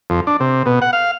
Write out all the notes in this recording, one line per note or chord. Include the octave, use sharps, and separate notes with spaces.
F2
D4
C3
B2
F#5
F5